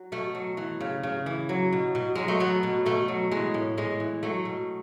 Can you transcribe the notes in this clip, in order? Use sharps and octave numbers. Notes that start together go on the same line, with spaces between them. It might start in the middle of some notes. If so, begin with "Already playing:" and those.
Already playing: F#3
B2 A3
F#3
E3
C#3
C#3
E3
F#3
B2
B2
F#3 G#3
A3
F#3 B3
B2
B2 A3
F#3
E3 G#3
A2
A2 G#3
E3
F#3 A3
B2